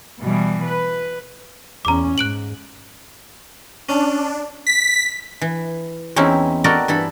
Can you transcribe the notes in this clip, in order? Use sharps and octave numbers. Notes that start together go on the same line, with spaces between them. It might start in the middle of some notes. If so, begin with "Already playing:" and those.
B2 E3 G3
B4
E2 C#4 A#5 D6
G#2 F#6 D7 F#7
C#4 D4
B6
E3
E2 C4 C#4 D#4 E4
F#4 A4 A#4 D5 D#5 G5
G2 E3 A4 B5